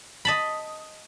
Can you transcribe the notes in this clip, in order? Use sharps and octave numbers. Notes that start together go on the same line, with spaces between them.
D#5 A5 B5